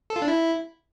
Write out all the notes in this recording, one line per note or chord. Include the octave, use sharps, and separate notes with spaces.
A4
F4
D4
E4